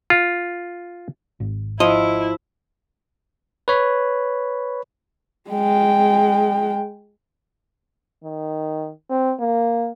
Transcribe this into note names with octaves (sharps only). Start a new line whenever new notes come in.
F4
G#1
F3 E4 D#5
B4 C#5 B5
G#3 G5
D#3
C4
A#3